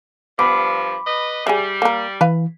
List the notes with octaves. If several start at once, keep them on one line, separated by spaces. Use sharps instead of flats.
G2 F3 B3 B5 D6
B4 D#5
G3 G#4 E5
A#3 A#4
E3 B4 F5